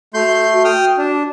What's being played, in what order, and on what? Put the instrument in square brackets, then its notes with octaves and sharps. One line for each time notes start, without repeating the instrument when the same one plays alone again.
[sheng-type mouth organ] A3 C6 G6 [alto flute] F#4
[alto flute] F#4
[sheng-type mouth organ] G5 D#6 F6
D4